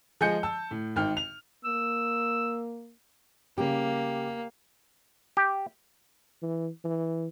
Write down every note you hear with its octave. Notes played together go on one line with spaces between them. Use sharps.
F3 G#3 D#5 G#5 G6 C#7
A5 E6
A2
G#1 D#3 G5 F6
F7
A#3 E6
C#3 G3 A#3 G4
G4
E3
E3